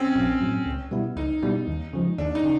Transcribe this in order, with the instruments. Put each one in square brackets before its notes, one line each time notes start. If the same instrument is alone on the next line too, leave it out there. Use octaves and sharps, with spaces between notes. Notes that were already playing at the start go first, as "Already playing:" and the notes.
Already playing: [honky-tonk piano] C4 C#4
[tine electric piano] A#1
A2 F#3
C#2
B2 G3 B3 E4
[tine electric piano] C#2 [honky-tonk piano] D#4
[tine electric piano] B2 G3 B3 E4
D#2
C#3 F3 G#3
[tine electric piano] D#2 [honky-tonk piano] D4
[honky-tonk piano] D#4
[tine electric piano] C#3